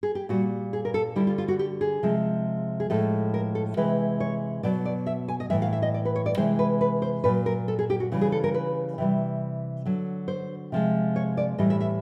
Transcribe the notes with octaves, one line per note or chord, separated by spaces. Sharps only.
G#4
G4
A#2 G3 F#4
G#4
A#4
A4
D3 G3 E4
F4
F4
F#4
G4
G#4
C3 F3 G#3
G#4
A2 F3 G#3 A4
A#4
A4
C3 E3 G#3 B4
C#5
B2 F#3 D5
D5
E5
G#5
D#5
A2 E3 G#3 E5
F5
E5
D#5
D5
B4
C#5
D5
C3 E3 G#3 C5
B4
B4
C5
A#2 F#3 B4
A#4
A4
G#4
G4
F#4
C#3 E3 G3
G#4
A4
A#4
B4
C3 E3 G3
D3 F#3
C5
C3 F3 G#3
C#5
D5
A2 E3 G3 D#5
E5
E5